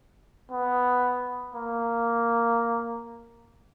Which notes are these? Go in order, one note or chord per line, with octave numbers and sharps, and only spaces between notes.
B3
A#3